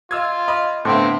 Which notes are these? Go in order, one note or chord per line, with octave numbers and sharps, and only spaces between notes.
F4 D#5 E6 G#6
D#5 B5 D#6
A2 D3 B3 C4 E5 F5 C6